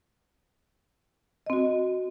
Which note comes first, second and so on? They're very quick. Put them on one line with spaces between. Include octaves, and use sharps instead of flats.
D#5 C4 F#4